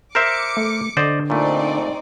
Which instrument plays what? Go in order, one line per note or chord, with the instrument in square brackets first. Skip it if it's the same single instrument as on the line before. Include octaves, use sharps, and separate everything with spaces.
[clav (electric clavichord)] A#4 C5 E5 [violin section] D6 C#7
[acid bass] A3
[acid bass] D3 [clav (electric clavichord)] C5 D5 D#5
[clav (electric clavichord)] A#2 A3 [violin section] C4 D#4 D5